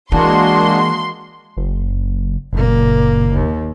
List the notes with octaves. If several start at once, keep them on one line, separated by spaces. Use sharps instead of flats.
E3 G#3 A#3 D4 F#4 C6
F#1
F#1 A#2 A#3
D#2